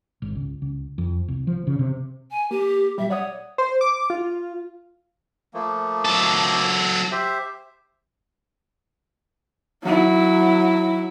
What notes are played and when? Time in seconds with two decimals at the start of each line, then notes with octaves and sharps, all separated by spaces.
0.22 G#1
0.35 C#2
0.62 C#2
0.98 F2
1.28 C2
1.47 F3
1.67 C#3
1.79 C3
2.30 G#5
2.51 A#3 G4
2.98 A#2 F#3 G3 E5
3.10 C#5 D5 F#5 D#6
3.58 C5
3.81 D6
4.10 F4
5.54 F3 A3 A#3
6.05 F#3 A4
7.11 G4 C5 E5
9.83 F#3 E4